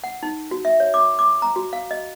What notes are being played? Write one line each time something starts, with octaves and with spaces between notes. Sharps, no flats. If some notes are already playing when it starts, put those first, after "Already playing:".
F#5
D#4
F#4
E5
C#5
D6
D6
A#5
F#4
F5
D#5